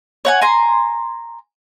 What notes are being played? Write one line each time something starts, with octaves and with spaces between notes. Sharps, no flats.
C#5 F#5 G#5
G#5 A#5 C6